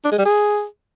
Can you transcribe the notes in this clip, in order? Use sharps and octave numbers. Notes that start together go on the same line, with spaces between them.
D4
G#3
G3
G#4